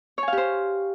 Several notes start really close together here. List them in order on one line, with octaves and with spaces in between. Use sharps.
C#5 G#5 F5 G4 C5